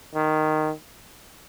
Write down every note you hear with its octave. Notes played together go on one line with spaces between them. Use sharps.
D#3